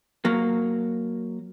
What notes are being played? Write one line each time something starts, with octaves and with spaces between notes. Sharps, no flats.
F#3 A#3